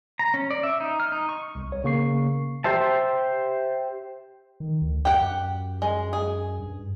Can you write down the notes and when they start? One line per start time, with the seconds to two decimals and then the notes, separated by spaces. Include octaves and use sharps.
0.19 A#5
0.34 C#4
0.50 D5
0.63 E5
0.80 D#4
1.00 F6
1.12 D#4
1.29 C#6
1.55 C2
1.72 C#5
1.84 C#3 A#3 C#6 C7
2.64 G4 C5 E5 A5
4.60 D#3
4.81 D2
5.05 F#2 G4 F#5
5.82 G#3
6.13 G#4
6.60 G2